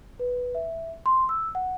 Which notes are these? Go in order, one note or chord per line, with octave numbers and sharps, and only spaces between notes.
B4
E5
C6
E6
F#5